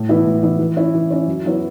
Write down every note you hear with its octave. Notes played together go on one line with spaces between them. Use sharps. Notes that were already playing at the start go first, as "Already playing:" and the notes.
Already playing: A2
E3 B3 E4
A2
E3 B3 E4
E3
C#4 E4 C#5
E3
C#4 E4 C#5
F#2
F#3 B3 E4 C#5